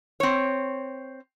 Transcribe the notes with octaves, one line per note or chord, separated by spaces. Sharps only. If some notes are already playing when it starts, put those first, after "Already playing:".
C4 C#5